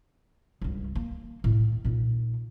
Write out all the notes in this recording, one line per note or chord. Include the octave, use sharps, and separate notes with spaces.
C#2 G2
A#3
D2 A2
A#2 D#4